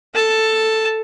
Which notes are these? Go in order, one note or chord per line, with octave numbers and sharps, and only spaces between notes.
A4 A5